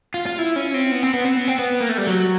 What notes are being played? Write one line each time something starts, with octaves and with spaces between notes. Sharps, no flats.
F4
F4
E4
C#4
C4
B3
C4
B3
C4
B3
C4
B3
A#3
A3
G3
F#3